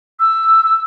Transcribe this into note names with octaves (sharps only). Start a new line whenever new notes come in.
E6
E6